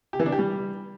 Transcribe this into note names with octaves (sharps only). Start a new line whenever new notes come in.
G4
E3
D4
G4
G3